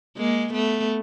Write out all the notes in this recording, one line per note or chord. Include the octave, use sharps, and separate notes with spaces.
G#3 A#3
A3 B3